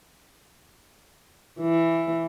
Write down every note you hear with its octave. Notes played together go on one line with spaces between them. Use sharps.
E3